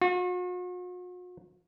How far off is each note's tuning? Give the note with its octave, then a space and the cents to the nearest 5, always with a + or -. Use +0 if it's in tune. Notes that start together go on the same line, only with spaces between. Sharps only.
F#4 -45